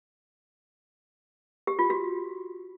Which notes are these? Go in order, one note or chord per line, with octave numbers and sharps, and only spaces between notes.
G4
F4
F#4